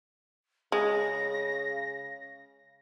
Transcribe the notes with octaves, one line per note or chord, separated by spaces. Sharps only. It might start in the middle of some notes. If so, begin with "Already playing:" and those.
C#3 G#3 A#6